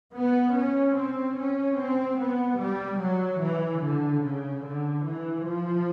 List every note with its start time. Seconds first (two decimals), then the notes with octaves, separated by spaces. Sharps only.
0.14 B3
0.54 C#4
0.95 C4
1.37 C#4
1.78 C4
2.19 B3
2.59 G3
3.00 F#3
3.41 E3
3.82 D3
4.23 C#3
4.64 D3
5.05 E3
5.46 F3